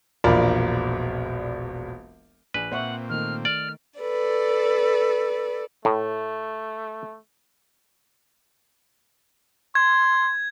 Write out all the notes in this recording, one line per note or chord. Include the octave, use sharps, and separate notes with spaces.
E1 A#1 F4 A#4 D5 B5
A#1 B4 G#5
A#2 C4 C5 E5 F#5 C#6
D#3 A3 F6
D5 F6
A4 B4 D5
A2 A3
C6 G#6